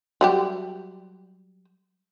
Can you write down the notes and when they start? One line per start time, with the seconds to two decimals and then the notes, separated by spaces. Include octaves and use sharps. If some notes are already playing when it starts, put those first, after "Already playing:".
0.21 F#3 G3 G4